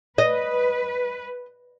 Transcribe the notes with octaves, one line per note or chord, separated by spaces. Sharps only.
B4 D#5